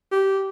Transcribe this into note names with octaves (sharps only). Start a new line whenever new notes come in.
G4